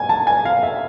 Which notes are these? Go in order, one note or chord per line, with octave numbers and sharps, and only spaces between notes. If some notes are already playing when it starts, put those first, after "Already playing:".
Already playing: G#5
A5
G#5
F5
E5